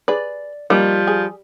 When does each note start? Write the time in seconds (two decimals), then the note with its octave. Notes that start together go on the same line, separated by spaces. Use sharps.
0.08 G#4 B4 D5
0.70 D#3 F3 G3 A#3 A#4
1.07 G#4